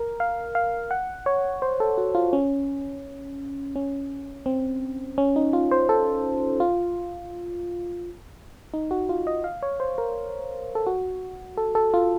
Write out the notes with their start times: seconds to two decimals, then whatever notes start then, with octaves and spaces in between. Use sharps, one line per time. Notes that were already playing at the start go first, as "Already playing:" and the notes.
Already playing: A#4
0.20 F5
0.55 F5
0.91 F#5
1.26 C#5
1.62 C5
1.80 A4
1.98 F#4
2.15 F4
2.33 C#4
3.76 C#4
4.46 C4
5.18 C#4
5.36 D#4
5.53 F4
5.72 C5
5.89 A4
6.60 F4
8.74 D#4
8.91 F#4
9.09 F4
9.27 D#5
9.44 F5
9.62 C#5
9.80 C5
9.98 A#4
10.75 A4
10.87 F#4
11.57 A4
11.75 A4
11.94 F4